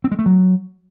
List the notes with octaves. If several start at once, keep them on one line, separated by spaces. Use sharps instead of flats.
C4
G#3
A3
F#3